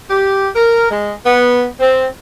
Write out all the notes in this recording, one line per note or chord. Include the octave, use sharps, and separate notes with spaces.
G4
A#4
G#3
B3
C4